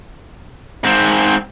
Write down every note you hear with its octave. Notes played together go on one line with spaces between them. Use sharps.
G#2 C4